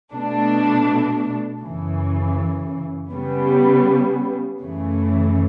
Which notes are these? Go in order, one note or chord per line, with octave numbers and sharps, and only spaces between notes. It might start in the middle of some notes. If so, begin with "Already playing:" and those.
B2 A3 D4
F#2 C#3 E3
C#3 G3 B3
F#2 C#3 E3 A3